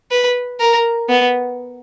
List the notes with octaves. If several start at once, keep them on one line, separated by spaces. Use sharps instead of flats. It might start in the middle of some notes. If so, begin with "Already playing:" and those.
B4
A#4
B3